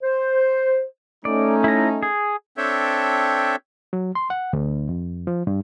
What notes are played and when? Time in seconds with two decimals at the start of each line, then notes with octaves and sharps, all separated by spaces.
0.02 C5
1.25 A3 C#4 D#4 D5
1.64 E4 A#5
2.03 G#4
2.57 C4 D4 A4 C#5 E5 G5
3.93 F#3
4.15 C6
4.30 F#5
4.53 D2
4.89 F2
5.27 F3
5.47 G2